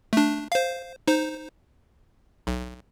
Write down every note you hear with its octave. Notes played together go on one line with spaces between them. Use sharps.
A3 D4
C5 F5
D#4 C5
B1